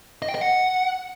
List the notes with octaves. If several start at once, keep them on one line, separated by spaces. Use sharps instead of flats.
D#5
G5
D#5
F#5